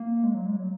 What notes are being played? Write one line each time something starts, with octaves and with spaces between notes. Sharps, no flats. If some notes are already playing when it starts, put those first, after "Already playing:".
Already playing: A#3
G#3
F#3
G#3
F#3